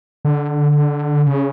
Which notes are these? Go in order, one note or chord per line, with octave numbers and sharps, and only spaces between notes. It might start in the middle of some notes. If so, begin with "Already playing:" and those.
D3
C#3